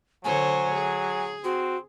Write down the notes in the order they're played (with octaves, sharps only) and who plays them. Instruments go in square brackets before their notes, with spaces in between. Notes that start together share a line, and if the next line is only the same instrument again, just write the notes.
[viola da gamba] D3 C5 C#5 [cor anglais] F#3 [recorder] G#5
[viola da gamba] G#4
[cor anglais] C4 [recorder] F#4